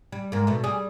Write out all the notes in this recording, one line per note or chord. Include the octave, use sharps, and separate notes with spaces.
G3
G#2 A#3
B2 A3
G3 G#4